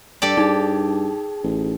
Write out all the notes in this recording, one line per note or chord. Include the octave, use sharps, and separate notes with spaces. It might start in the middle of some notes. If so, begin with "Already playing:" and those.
G2 G4 A4 D5
G2 D#4 G#4
A1